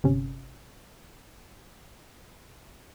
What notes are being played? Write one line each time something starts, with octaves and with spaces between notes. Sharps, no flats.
G1 C3 C#4